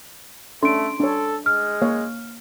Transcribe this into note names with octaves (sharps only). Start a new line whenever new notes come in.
A3 C#4 D4 A4 C6 D7
D4 A4 C#5
G#3 F6
A#3 C#5 F5